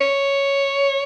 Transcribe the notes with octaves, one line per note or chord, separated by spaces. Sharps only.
C#5